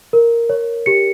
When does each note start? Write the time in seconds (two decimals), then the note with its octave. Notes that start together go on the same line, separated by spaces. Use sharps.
0.13 A#4
0.50 C#5
0.86 G4 C#7